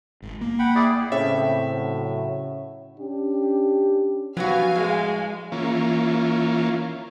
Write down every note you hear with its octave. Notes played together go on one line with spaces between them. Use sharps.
G#1
A#3
F#5 G5 B5
E4 G#4 D5
A2 C#3 C4 E5
F#3
C#4 D4 G4
F3 F#3 B3 F#4 F5 G#5
A2 G#3
E3 A#3 C#4 F4